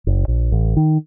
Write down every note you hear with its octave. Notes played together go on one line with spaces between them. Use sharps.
F#1
A#1
A1
D#3